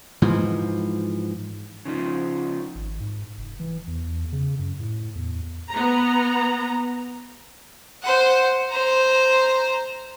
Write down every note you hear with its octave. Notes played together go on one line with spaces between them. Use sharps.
G#2 E3 F3
C#3 F3 D#4
G#1
G#2
F1
E3
E2
C#3
F#2
A2
E2
B3 A#5
C5 F#5
C5 A#5